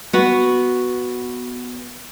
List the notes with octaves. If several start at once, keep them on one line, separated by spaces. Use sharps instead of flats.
B3 F#4